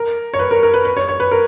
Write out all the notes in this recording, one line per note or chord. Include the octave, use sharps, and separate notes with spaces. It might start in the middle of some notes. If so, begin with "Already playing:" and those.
Already playing: A#4
C#5
B4
A#4
A#4
B4
B4
C#5
C#5
B4
A#4